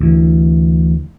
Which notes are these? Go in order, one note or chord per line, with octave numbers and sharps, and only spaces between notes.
D2 E3